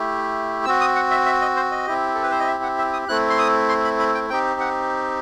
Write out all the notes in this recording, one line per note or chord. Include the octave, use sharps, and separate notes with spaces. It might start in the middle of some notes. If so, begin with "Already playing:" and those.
Already playing: A3 E4 G4
C4 F#4 E6
D#6
F#5
E5
E5
D#5
C5
D#5
C4 E4 G4
A4
B4
C5
D#5
E5
F#5
E5
D#6
A3 C4 E4 F#6
C6
D#6
C6
B5
B5
G5
C4 D#4 G4 G5
F#5